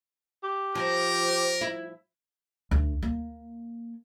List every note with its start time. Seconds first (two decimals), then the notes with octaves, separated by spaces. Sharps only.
0.43 G4
0.75 F3 A#4
1.61 E4
2.71 D2
3.03 A#3